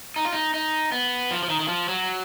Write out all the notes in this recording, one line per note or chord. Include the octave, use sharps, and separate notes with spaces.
D#4
F4
D#4
D#4
B3
F3
F3
D#3
D#3
F3
F#3